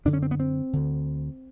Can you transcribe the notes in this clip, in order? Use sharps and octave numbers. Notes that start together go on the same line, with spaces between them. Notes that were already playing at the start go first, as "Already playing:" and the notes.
F#2 D3 D4
C#4
C4
B3
C4
D2 D3